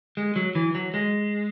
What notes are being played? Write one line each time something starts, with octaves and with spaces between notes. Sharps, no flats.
G#3
F#3
E3
F#3
G#3